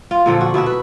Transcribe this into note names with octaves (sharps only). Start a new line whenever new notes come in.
F4
A#2 D3 F3 A4
F#4
B2 E4 F#4 E5
B4